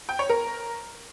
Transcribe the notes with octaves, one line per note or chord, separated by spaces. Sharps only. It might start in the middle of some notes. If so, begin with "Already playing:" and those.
G5
C#5
A#4